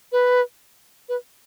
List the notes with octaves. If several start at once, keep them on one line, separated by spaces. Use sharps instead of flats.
B4
B4